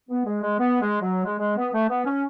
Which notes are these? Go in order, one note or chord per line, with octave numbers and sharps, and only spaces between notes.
B3
G#3
G#3
B3
G#3
F#3
G#3
G#3
B3
A3
B3
C#4